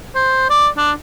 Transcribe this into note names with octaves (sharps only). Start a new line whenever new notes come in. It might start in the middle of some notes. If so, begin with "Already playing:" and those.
C5
D5
D4